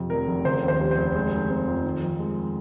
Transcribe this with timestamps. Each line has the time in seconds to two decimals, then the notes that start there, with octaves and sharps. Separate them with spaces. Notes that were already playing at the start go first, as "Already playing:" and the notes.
Already playing: F2 C3
0.10 F1 A#4
0.27 F1
0.45 C#3 C5
0.63 D#2
0.68 C5
0.80 G3
0.91 C5
0.97 F1
1.15 G#3
1.33 D#3
1.50 C4
1.67 F2
1.85 D#3
2.02 F2
2.19 G#3